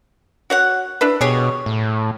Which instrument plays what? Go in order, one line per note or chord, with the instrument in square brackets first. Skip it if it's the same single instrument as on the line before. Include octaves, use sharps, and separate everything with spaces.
[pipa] F#4 C#5 F#5
D4 E4 B4
[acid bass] B2 [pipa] G4 G#4 C#5
[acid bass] A2